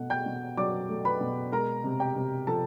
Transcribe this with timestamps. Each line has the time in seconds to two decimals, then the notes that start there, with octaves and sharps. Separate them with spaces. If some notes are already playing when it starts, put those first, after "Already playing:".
Already playing: B2 A3 F#5
0.10 G5 G6
0.26 B2
0.57 F#3 D5 D6
0.89 A3
1.05 B4 B5
1.21 B2
1.52 G#3 A#4 A#5
1.84 C3
2.00 G4 G5
2.16 C3
2.47 F3 A4 A5